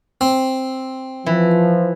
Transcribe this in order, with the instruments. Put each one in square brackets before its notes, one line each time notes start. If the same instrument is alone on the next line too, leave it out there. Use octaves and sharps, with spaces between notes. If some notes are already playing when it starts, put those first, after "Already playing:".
[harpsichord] C4
[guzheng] E3 [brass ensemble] F3